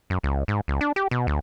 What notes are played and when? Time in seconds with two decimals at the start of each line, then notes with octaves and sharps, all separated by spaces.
0.10 F#2
0.23 C#2
0.48 G#2
0.68 C#2
0.81 D4
0.96 G4
1.11 B2
1.27 D2